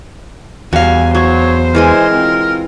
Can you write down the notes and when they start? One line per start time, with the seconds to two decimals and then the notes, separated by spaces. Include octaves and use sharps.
0.73 E2 G3 F#4 F5 G#5
1.15 F#3 C5 C#5
1.75 E3 G#3 A#4 G#5
2.13 C4 F4